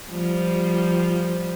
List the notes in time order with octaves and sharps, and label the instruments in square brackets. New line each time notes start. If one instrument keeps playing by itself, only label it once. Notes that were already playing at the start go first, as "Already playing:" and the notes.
[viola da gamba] F3 G3